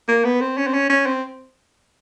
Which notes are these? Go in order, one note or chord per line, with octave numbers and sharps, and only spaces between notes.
A#3
B3
C4
C#4
C4
C#4
C#4
C4